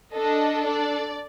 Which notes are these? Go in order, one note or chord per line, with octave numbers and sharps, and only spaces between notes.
D4 A4 D#5
D5